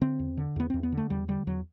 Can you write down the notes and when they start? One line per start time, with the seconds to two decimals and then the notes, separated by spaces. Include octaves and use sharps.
0.01 D3 C4
0.19 E2
0.37 D3
0.56 E2 B3
0.70 E2 C4
0.83 B3
0.92 D3
0.97 A3
1.10 E2 G3
1.28 D3 G3
1.47 E2 F#3